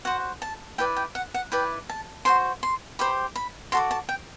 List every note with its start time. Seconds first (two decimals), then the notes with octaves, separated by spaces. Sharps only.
0.05 F#4 C5 F#5
0.42 A5
0.78 E4 B4 D5 G5
0.96 G5
1.15 F#5
1.34 F#5
1.52 E4 B4 D5 G5
1.89 A5
2.25 F#4 A4 C5 C6
2.63 C6
2.99 G4 C5 B5
3.36 B5
3.72 F#4 A4 D5 C6
3.91 A5
4.09 G5